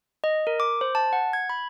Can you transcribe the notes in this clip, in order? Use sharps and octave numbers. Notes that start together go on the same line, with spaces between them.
D#5
A#4
D6
C5
A5
F#5
G#6
B5